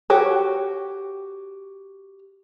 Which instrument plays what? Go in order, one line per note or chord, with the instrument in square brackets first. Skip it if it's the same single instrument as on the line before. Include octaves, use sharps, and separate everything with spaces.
[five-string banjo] F#4 G4 C#5